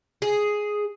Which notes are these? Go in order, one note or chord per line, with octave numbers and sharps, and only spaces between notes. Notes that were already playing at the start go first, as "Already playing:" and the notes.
G#4